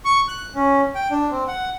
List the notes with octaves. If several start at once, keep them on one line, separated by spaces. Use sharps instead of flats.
C#6
F#6
C#4
G5
D4
C4
F#5